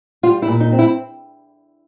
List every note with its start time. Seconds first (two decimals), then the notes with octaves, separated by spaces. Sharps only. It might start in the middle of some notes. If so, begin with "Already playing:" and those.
0.23 G3 F4
0.42 E4
0.48 A#2
0.60 D#4
0.72 C4
0.79 E4